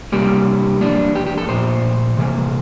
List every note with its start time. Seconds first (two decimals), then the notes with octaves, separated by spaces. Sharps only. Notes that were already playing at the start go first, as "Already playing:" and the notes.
0.12 C3 G3 A#3 G4
0.81 F2 E3 A#3 D4
1.15 G4
1.27 G4
1.38 A4
1.49 A#2 F3 A3 C5
2.17 C3 E3 A#3